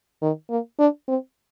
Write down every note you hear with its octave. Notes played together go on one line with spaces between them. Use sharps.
D#3
A#3
D4
C4